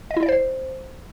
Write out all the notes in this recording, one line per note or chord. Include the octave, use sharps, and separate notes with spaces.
D#5
E4
D5
C5